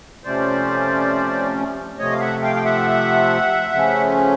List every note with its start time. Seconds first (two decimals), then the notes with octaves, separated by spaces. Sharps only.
0.24 C3 F3 A3 C#4 C5 D5
1.99 C3 F3 A3 C#5 D#5
2.12 F5
2.20 E5 F#5
2.43 F5 G5
2.56 G5
2.65 E5 F#5
3.73 C#3 F3 A3 C#4